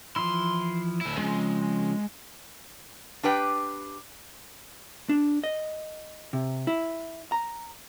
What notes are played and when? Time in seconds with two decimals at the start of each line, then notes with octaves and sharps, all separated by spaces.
0.16 E3 F3 E4 C6
1.01 D2 E4
1.18 C#3 F3 G#3 C4
3.23 D4 G4 B4 G5
5.09 D4
5.44 D#5
6.33 C3
6.67 E4
7.32 A#5